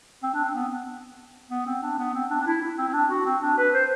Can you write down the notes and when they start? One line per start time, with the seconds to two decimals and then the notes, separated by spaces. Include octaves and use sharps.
0.23 C4
0.34 D4
0.44 C4
0.55 B3
1.51 B3
1.66 C4
1.82 D4
1.98 B3
2.14 C4
2.30 D4
2.41 D4
2.46 E4
2.62 E4
2.78 C4
2.88 C4
2.94 D4
3.10 F#4
3.26 C4
3.42 D4
3.58 B4
3.74 C5